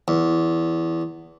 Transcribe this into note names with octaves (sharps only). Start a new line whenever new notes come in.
E2